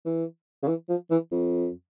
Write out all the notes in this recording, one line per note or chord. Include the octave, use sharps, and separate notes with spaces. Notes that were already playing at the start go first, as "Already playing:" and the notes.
E3
C#3
E3
F3
E3
F2